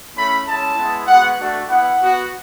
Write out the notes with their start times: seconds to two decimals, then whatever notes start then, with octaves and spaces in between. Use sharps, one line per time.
0.15 A3 C#4 E4 B5
0.46 G#3 C#4 E4 A5
0.76 G#3 B3 E4
1.07 G#3 B3 F#4 F#5
1.38 A3 D4 F#4
1.68 B3 E4 F#5
1.99 B3 F#4